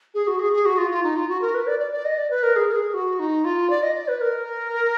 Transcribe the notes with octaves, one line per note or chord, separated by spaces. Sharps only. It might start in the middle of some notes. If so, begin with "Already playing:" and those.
G#4
F#4
G#4
G#4
F#4
F4
F4
D#4
F4
F#4
A#4
B4
D5
D5
D5
D#5
D5
B4
A#4
G#4
A#4
G#4
F#4
D#4
F4
D5
D#5
D5
B4
A#4